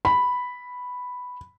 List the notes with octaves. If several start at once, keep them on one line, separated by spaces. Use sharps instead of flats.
B5